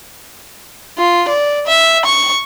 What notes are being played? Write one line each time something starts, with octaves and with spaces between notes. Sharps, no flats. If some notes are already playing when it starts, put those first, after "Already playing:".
F4
D5
E5
C#6